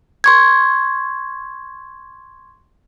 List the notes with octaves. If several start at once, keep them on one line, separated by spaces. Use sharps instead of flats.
C6 C#6 G#6